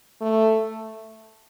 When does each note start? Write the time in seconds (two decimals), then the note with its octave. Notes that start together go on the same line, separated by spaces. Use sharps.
0.21 A3